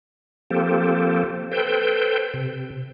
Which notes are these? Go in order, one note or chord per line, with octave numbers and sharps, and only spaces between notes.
F3 A#3 C4 G4 A4
A4 B4 C5 G5
C3